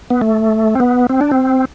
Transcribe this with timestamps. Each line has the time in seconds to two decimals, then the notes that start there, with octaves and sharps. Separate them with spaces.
0.10 B3
0.21 A3
0.75 C4
0.80 B3
1.09 C4
1.21 D4
1.31 C4